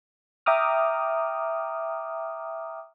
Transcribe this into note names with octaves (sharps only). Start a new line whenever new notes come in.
E5 G5 A#5 D6 D#6 F6